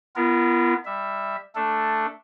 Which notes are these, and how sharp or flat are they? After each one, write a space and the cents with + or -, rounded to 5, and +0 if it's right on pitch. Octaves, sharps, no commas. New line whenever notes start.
B3 +0 F4 -40 A#4 +0
G3 +15 E5 +0
A3 +0 D4 +0 A4 +0